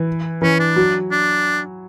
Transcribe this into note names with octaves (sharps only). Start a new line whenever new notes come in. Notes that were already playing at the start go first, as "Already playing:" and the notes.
Already playing: E3
E3 C#4
D4
F#3
D4